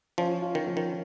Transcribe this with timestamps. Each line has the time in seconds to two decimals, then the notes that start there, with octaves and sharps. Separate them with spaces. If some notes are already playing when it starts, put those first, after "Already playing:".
0.18 F3 C#4
0.42 F4
0.55 D#3
0.67 F3
0.77 D#3